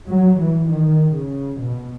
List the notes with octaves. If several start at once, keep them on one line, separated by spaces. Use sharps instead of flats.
F#3
E3
D#3
C#3
B2